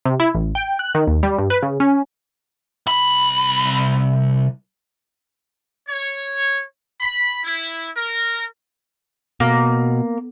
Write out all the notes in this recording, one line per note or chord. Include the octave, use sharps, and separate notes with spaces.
C3
E4
A1
G5
F#6
D#3
D#2
G3
G2
B4
C#3
C#4
C2 B5
C#5
B5
E4
A#4
B2 A#3